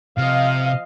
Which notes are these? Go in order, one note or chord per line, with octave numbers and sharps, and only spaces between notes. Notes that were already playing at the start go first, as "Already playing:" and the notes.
C3 F3 D#5 F5